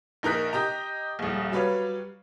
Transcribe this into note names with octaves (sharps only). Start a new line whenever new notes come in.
A#1 D#4 A#4 F#6 B6
G4 D#5 A#5
D#1 A#1
F#3 G3 B4 C#5 F5